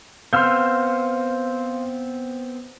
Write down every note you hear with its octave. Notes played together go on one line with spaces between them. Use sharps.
B3 C4 F5 C6 E6 F6 G6